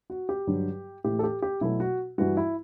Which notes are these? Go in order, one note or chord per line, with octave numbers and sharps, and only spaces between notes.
F#4
G4
G2 D3 F#3
A2 E3 A3 G4
A4
G4
G4
B2 F#3 A3 E4
F#4
G2 E3 G3 F#4
E4